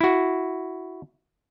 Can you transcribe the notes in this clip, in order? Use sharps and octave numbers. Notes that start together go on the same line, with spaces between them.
E4 F#4